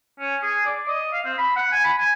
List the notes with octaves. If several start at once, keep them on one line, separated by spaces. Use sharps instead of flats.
C#4
G#4
D5
D#5
F5
C4
B5
F#5
G#5
B5
G#5